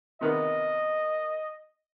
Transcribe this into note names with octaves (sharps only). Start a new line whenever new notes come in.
C3 D#3 B3 D#5